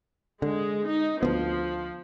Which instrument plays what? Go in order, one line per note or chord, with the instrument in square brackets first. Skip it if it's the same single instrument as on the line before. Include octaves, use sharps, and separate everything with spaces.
[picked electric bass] D3 [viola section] G#3
[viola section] D#4
[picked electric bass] D2 B3 [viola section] F3